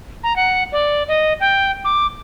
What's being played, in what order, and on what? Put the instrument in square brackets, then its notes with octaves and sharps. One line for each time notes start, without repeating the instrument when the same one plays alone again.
[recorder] A#5
F#5
D5
D#5
G5
D6